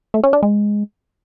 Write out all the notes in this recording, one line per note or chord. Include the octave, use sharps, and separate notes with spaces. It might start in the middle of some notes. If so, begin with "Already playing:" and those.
A3
C#4
D4
G#3